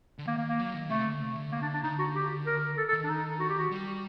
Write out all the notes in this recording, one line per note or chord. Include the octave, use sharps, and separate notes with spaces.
D3
D#3 A#3
A#3
A#3
F#3
D#3
C3 A3
D3
C3
D3
A#3
D4
D4
D3 D#4
F#4
G4
A#4
A4
A4
D#3
D4
D#4
F#4
G4
F#4
G3